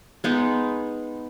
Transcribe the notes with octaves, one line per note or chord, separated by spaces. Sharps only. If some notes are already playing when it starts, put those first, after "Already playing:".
G#3 B3 D#4